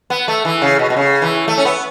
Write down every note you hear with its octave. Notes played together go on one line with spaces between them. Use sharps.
B3
A3
E3
C#3
B2
B2
C#3
E3
A3
C#4
B3